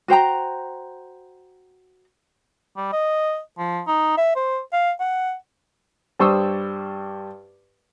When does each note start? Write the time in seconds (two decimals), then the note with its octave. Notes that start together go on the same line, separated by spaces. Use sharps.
0.08 F#4 C5 G5 A#5
2.77 G3
2.92 D#5
3.58 F3
3.87 D#4
4.17 E5
4.36 C5
4.73 F5
5.00 F#5
6.19 G2 G3 C5 C#6 D#6 E6